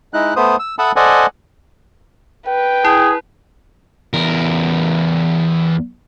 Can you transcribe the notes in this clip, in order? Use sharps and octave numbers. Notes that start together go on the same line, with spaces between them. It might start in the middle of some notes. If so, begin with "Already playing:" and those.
G#3 D#4 E4 F#6
A3 B3 C5 D#6
E6
A4 E5 F#5 A5 B5 D#6
A4 C5 D5 D#5 F#5 G#5
B4 G5
E4 G#4
E2 A#4